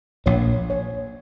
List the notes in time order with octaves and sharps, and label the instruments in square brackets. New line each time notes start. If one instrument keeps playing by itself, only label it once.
[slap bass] A#1 A#2 [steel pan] C#5
[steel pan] C#5